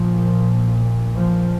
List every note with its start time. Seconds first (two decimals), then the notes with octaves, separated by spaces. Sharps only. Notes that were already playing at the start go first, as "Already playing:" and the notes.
Already playing: A#1 A#2 F3
1.16 F3